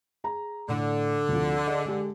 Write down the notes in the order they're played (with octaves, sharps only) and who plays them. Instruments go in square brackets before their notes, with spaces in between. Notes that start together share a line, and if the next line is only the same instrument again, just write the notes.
[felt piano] G#4 A#5
[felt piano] A2 [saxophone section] D3
[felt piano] D2 C3 F3
G#4 D#5
G#3 G4